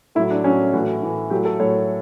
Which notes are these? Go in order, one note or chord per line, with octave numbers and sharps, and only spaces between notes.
A2 F#3 E4
D4
A2 F#3 C#4
A2 E3 F#4
A2 E3
A2 F#3 G4
A4
A2 F#3 C#5